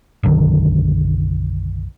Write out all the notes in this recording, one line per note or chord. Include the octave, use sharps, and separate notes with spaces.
F#1 B1 D3 D#3